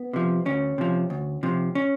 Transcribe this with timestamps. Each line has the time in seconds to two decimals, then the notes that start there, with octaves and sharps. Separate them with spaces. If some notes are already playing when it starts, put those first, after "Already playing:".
Already playing: B3
0.13 C3 F3
0.46 D2 C#4
0.78 C3 F3
1.10 D2
1.43 C3 F3
1.75 C#4